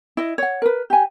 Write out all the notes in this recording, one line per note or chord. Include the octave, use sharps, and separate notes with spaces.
E4 D#5
C#5 F#5
A#4 B4
G4 G#5